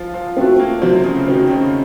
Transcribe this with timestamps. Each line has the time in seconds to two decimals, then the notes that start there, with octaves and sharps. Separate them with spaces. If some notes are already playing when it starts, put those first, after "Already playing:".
Already playing: F3 F4
0.14 F3 F4
0.37 A3 C4 F#4
0.60 A#3
0.82 C3 F#3 C4
1.04 C#3 C#4
1.28 D#3 C4 D#4 F#4
1.50 C#3 C#4